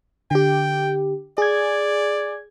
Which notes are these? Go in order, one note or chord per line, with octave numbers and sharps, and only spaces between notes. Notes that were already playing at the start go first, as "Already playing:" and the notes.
D3 G4 G5
G#4 D5 G#6